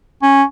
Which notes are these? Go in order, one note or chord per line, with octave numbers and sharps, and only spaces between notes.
C#4